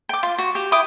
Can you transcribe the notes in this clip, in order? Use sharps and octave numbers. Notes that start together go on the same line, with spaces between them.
G5 D6
F4
F#4
G4
E4 G5 D6 D#6